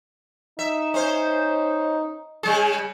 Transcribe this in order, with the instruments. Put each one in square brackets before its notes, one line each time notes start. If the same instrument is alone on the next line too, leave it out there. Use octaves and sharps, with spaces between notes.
[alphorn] D#4 [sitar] E5
[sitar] C#4 C5
C#3 G3 G#4